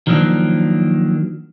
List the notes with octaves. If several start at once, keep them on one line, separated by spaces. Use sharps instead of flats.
D#3 F3 F#3 A#3 D4